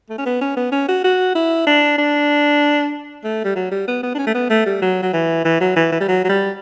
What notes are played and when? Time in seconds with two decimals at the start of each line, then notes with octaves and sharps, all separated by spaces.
0.09 A3
0.18 C#4
0.26 B3
0.41 C#4
0.57 B3
0.72 C#4
0.89 F#4
1.04 F#4
1.35 E4
1.67 D4
1.98 D4
3.24 A3
3.45 G3
3.56 F#3
3.72 G3
3.88 B3
4.03 B3
4.15 D4
4.18 C#4
4.27 A3
4.35 B3
4.50 A3
4.66 G3
4.82 F#3
5.02 F#3
5.13 E3
5.45 E3
5.61 F#3
5.76 E3
5.92 E3
6.01 G3
6.08 F#3
6.24 F#3
6.29 G3